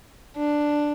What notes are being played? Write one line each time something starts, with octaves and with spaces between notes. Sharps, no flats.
D4